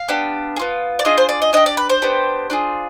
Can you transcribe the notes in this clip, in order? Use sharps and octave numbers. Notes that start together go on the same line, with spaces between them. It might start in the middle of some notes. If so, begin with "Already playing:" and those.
Already playing: F5
B3 D4 G4
G#4
B3 F4
D5
D4 F4 G#4 D#5
C5
D5
D#5
D4 G4 D#5
D5
B4
C5
B3 D4 G4
D4 F4 G#4